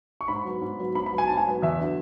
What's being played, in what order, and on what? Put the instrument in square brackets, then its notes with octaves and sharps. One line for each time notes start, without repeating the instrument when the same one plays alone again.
[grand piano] C#6
G#2 B5
F#3 B3
G#2
F#3 B3
G#2 B5
B5
F#3 B3
G#5
G#2 A5
G#5
F#3 B3
E2 E5
D3 F#3 B3